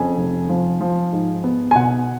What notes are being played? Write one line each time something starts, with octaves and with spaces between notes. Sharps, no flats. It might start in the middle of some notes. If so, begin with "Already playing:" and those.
Already playing: F2 C#3 G#5
F1
F3
F3
G#2
B3
G#5
B2 F#5